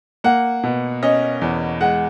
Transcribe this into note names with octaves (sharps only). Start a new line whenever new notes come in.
A#3 F#5
B2
C#4 D#5
E2
G#3 F#5